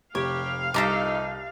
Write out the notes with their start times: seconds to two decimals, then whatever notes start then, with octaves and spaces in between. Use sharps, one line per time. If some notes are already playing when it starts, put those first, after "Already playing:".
0.15 F1 C3 G4 C#5 F5
0.74 C2 F2 A#2 D#4 E5 A#5 D6 A6